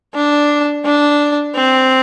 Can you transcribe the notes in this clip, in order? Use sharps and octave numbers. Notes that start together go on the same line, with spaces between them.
D4
D4
C4